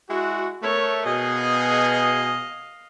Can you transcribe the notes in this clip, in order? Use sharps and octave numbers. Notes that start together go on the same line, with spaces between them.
G#3 E4 F#4
A3 A#4 C#5
B2 G#4 D#5 F5